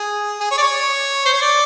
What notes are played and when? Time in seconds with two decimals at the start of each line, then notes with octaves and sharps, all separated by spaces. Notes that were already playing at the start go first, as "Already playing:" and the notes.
Already playing: G#4
0.40 G#4
0.51 C#5
0.58 D5
0.62 C#5
1.25 C5
1.33 C#5
1.41 D5